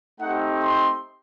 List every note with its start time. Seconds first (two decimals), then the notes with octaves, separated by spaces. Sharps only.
0.19 A3 C4 D#4 G4 F#5
0.61 C6